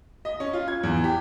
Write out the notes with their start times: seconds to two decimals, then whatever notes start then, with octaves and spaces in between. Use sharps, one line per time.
0.25 D#5
0.40 C#4
0.53 F4
0.68 G#6
0.83 E2
1.04 G4